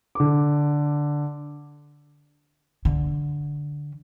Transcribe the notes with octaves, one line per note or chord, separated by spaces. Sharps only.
D3 D6
D3